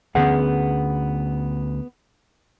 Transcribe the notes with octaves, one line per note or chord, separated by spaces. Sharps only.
D2 D3 B3 C#4 G#4 F#5